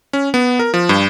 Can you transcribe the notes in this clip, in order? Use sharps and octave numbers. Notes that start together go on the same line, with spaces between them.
C#4
B3
A#4
F3
G2